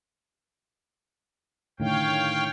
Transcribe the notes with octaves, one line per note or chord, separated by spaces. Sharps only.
A2 D3 D#3 C#5 F5 G5